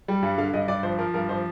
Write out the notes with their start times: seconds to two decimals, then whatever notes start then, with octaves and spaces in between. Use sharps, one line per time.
0.08 G3
0.23 G2
0.38 D3 F5
0.53 G2 D#5
0.68 G2 D5
0.83 F3 C5
0.98 F3 A#4
1.14 G2 A#4
1.29 F3 C5